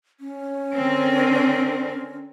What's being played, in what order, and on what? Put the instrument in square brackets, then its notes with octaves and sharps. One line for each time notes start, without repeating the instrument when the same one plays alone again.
[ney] C#4
[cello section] D3 C4 A#4